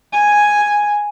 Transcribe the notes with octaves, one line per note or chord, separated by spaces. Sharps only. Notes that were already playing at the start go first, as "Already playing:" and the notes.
G#5